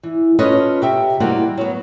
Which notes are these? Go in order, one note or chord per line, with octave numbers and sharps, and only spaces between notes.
E3
C#4 F4 A4 B4 C#5 D#5
C3 G4 E5
E3 G3 A#3 C4 D#4 F#4
F#3 B3